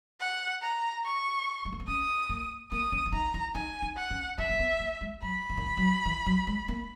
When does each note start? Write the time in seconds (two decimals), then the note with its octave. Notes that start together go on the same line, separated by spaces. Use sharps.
0.20 F#5
0.62 A#5
1.04 C#6
1.65 G#3
1.72 A#3
1.80 B3
1.87 C#4 D#6
2.29 A#3
2.71 A#3 D#6
2.92 C#4
3.06 C#4
3.12 D#4 A#5
3.34 E4
3.55 D#4 G#5
3.82 D#4
3.96 F#5
4.10 C#4
4.38 C#4 E5
4.49 A#3
4.59 B3
4.80 A#3
5.01 G#3
5.22 F#3 B5
5.49 E3
5.57 D#3
5.66 E3
5.77 F#3
6.05 E3
6.26 F#3
6.47 G#3
6.68 A#3